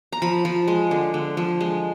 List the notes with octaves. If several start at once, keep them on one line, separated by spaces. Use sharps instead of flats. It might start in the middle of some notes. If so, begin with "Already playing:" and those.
A#5
F3 B5
F3
G#3
D3
D3
F3
G#3